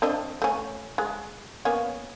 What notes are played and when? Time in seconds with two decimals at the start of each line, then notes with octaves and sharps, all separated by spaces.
0.02 C4 D4 D#5
0.42 A3 C#4
0.98 G#3
1.65 A#3 B3 C#4